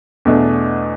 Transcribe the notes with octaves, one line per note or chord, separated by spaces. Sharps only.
E2 B2 A3 D4